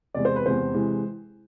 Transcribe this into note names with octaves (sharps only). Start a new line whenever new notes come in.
E2 C3 G#3 D5
C5
B4
E2 C3 G#3 C5
C3 E3 G#3